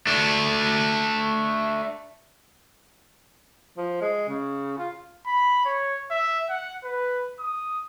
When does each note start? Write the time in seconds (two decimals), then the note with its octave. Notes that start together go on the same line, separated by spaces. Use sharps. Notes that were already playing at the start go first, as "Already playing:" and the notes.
0.07 A3 D4
3.77 F3
4.01 G#3
4.28 C#3
4.78 F4
5.26 B5
5.65 C#5
6.11 E5
6.49 F#5
6.84 B4
7.40 D#6